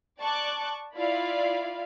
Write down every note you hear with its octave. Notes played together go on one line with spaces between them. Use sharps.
D5 A5 C#6 D6 F#6
E4 F4 D5 F5